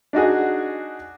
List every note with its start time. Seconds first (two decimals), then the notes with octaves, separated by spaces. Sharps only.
0.13 D4 D#4 F#4 G#4